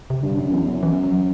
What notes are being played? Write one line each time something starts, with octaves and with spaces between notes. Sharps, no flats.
C3
G2 D3
F#2
E2
F#2
E3
F#3